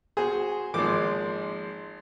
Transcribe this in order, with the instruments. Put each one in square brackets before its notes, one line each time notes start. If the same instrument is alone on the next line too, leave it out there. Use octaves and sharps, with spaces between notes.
[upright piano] F#4 C5 [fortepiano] G#4
[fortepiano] G#1 D6 [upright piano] F3 G#3 A#3